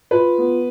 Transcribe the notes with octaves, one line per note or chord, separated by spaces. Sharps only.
F4 B4
B3